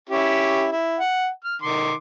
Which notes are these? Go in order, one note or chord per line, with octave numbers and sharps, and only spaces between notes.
C#4 E4 G4
E4
F#5
F6
D#3 C6 D6